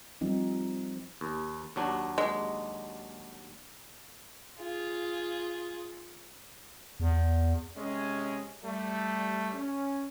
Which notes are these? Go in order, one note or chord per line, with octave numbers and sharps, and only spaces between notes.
F3 G3 C4 D#4
D#2
D#2 F#3 D4
G#3
F4 G#4
E2
C3 G#3 C#4
G3 A3
C#4